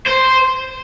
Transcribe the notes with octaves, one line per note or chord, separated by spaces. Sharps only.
C5